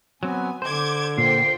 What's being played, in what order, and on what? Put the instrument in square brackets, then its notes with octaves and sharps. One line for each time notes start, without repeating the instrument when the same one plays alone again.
[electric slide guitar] F#3 C4 [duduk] B3 [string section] G#5
[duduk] D3 [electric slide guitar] C5 [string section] D6 G6 G#6
[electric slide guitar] A#2 [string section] F4 C5 G5 [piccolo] C7